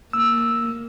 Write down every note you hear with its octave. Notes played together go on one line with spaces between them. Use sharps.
A#3 E6